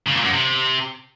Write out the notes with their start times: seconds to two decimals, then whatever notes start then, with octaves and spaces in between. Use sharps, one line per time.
0.07 C#3
0.15 A#2
0.24 F#2
0.33 C3